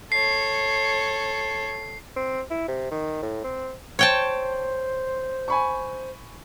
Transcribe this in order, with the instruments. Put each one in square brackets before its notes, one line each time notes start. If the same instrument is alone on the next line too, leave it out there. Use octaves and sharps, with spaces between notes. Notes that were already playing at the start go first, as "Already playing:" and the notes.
[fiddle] A4 C#5 [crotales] C7
[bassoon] C4
E4
C3
D#3
A2
C4
[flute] C5 [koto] C#5 G5 A5
[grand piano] G#5 B5 C#6